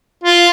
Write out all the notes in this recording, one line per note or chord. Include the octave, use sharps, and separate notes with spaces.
F4